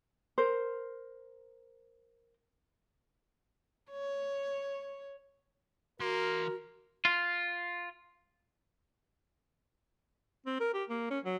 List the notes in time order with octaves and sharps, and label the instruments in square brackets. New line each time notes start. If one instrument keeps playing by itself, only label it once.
[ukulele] A#4 C5
[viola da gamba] C#5
[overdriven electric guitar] E3 C6 [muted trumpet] A#3 [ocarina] F#4 [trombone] A#4
[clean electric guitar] F4
[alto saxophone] C4
A#4
G4
A#3
C#4
F#3